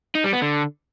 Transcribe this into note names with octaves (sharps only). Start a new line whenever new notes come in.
D#4
G3
B3
D3